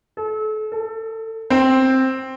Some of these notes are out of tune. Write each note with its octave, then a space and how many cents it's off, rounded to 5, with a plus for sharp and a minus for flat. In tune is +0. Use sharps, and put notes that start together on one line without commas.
A4 -35
A4 +25
C4 +5